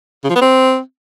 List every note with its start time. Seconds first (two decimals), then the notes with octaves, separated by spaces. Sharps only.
0.24 C#3
0.30 F3
0.36 B3
0.41 C4